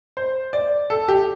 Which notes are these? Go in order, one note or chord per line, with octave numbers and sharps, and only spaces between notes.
C5
D5
A4
G4